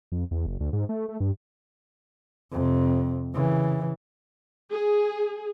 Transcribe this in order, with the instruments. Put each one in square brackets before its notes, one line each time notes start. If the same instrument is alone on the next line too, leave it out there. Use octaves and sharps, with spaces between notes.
[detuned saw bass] F2
E2
F#1
D2
G#2
A3
A3
G2
[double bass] F2 C3
C#3 E3
[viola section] G#4